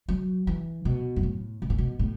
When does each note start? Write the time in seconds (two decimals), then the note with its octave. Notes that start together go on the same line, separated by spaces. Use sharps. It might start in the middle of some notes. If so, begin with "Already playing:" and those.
0.08 F#3
0.47 E3
0.85 B2
1.16 F#2
1.23 A2
1.62 B2
1.70 A2
1.78 B2
1.99 A2